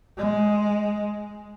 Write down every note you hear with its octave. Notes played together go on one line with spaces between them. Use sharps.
G#3